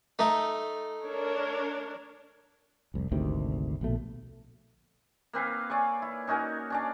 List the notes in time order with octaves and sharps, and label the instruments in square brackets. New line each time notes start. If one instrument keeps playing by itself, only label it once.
[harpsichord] A3 D#4
[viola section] D4 A#4 C#5
[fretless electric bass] F1 C2
G#1 D2 C3 D#3
A#1 B2 A3
[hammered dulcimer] A#3 C4 B4 F5
C#5 D5 G#5 C#6
E4
C#4 D#4 F#4 A#4
C#4 D4 D5